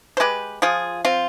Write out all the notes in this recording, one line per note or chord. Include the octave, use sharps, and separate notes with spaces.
C5
G#3 G4 B4
F3 F4 G#4
C4 F4